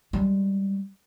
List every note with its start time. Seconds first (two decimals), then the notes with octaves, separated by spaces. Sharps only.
0.13 G3 G#3